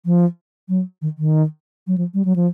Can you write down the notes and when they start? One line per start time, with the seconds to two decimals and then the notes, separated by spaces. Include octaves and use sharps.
0.06 F3
0.69 F#3
1.02 D#3
1.18 D#3
1.87 F#3
1.98 F3
2.14 G3
2.25 F#3
2.36 F3